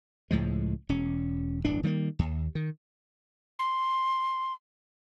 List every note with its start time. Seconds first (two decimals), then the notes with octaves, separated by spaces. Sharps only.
0.31 C#2 A2 F3 G#3
0.89 E1 C#4
1.65 D1 G1 E3 D4
1.83 D#3 G3 A3 A#3
2.19 D#2
2.55 D#3
3.59 C6